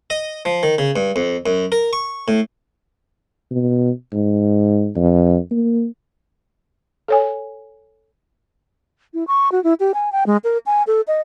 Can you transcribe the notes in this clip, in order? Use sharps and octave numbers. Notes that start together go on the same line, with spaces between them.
D#5
F3
D#3
C#3
G2
F2
F#2
A#4
C#6
A2
B2
G#2
F2
A#3
A4 C#5 G#5
E4
C#6
F#4
E4
G4
G#5
G5
G#3
A#4
G#5
A4
D#5